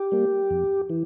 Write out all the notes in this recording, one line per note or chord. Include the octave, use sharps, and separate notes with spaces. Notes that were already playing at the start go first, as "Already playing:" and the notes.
Already playing: G4
G3 A#3
F2
E3